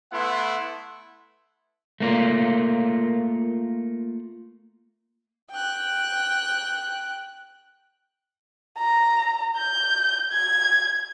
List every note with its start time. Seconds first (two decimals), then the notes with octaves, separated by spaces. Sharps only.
0.12 A3 B3 E4 F#5 C6
2.00 A3 A#3 F4
5.51 G5 F#6
8.78 A#5
9.57 G6
10.31 G#6